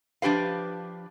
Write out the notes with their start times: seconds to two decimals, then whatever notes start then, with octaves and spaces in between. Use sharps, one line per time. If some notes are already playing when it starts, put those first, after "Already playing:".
0.22 F3 D4 G4 B4 F5